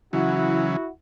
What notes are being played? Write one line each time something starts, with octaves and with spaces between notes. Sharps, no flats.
C#3 E3 F#3 E4 F#4